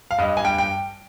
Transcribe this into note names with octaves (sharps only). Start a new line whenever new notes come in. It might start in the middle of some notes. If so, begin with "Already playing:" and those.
F5
G2 D#5
G#5
G2 G5
G5